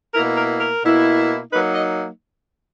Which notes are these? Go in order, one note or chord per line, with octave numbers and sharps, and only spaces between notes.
B2 A#3 E4 A#4
A#4
A#4
B2 A#3 E4
F#3 A#3 D#4 B4
D#5